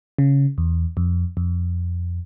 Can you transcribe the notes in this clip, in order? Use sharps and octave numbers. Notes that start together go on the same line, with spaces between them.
C#3
E2
F2
F2